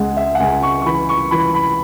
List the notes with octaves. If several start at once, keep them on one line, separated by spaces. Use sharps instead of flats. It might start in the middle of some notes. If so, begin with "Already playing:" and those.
Already playing: C#2 G#3 F#5
E5
F#5
C#2 G#5
C#6
C#6
E3 B5
C#6
E3 B5
B5